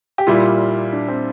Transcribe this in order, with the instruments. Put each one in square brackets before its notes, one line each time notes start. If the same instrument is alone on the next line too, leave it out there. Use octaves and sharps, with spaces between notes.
[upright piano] G4
[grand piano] A#2 G3 A#3 E4 [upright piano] F4
[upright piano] D4
C4